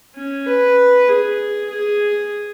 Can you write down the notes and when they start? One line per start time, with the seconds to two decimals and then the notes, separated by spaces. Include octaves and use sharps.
0.15 C#4
0.46 B4
1.08 G#4
1.70 G#4